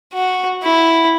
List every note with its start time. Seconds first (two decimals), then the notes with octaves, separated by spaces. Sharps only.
0.13 F#4
0.63 E4